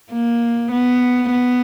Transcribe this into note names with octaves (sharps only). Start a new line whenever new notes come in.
A#3
B3
B3